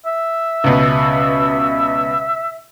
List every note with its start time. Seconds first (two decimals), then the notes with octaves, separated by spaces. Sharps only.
0.06 E5
0.64 C#2 B2